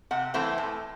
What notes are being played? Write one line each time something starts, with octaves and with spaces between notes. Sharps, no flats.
C3 F#5
E3 A3 C4 E4
A2